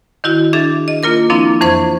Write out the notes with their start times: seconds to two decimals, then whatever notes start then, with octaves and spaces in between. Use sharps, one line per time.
0.24 D#3 E4 F#4
0.53 D4 G#4 E5 A6
0.88 D#5
1.03 A#3 F4 A#4 D6
1.30 F3 A#3 C4 D4 E4
1.61 F2 E3 C5 C#6 G#6